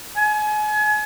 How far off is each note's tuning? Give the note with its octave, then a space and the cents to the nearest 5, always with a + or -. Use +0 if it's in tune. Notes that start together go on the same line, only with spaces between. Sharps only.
G#5 +35